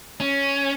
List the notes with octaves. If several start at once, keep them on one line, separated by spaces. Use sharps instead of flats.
C#4